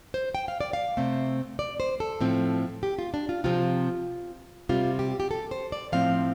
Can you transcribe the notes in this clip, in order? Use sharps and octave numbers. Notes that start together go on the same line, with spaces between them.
C5
G5
F5
D5
F5
C3 A3 C4
D5
C5
A4
A2 F3 C4
G4
F4
D4
F4
C3 F3 C4 F4
C3 G3 C4 F4
G4
G4
A4
C5
D5
A2 F3 C4 F5